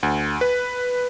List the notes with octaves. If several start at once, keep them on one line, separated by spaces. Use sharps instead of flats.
D2
B4